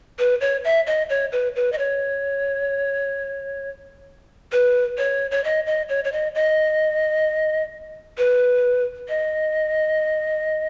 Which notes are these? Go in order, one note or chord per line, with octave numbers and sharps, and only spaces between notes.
B4
C#5
E5
D#5
C#5
B4
B4
D#5
C#5
B4
C#5
C#5
D#5
D#5
C#5
C#5
D#5
D#5
B4
D#5